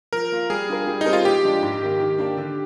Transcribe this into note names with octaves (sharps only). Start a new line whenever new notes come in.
F3 A#4
A#3 F4
G3 G#4
D4 F4 A#4
G3
C4 D#4 G4 A#4
F4
A#2 G4
F3 G#3 D4
G#2
D#3 A#3
D#3
A#3 D4
D3